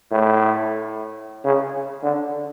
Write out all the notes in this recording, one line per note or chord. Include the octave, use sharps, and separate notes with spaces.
A2
C#3
D3